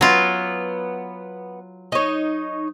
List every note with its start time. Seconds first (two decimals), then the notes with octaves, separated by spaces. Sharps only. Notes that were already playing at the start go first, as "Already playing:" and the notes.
0.01 F#3 B3 F4
1.92 D#4 C#5